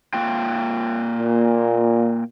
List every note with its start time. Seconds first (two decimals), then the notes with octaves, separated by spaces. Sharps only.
0.14 A#3 F4 G5
1.18 A#2